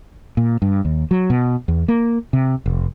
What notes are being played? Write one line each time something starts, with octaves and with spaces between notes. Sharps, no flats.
A#2
G2
D#2
F#3
B2
E2
A#3
C3
F1